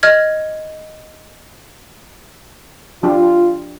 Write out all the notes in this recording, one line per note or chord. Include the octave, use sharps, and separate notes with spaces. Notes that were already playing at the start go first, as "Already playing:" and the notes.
D#5 F6 G#6
F3 D4 F4 G4